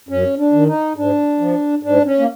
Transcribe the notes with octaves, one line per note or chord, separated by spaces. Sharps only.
F#2 C#4
D4
D#3
D#4
G#2 D4
F3
G#2 D4
C#4
A#3